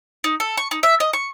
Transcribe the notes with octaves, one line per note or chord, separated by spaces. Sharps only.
D#4
A4
C#6
D#4
E5
D#5
C#6